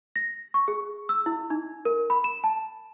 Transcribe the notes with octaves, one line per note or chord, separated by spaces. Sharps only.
A#6
C#6
G#4
E6
E4
D#4
A#4
B5
E7
A5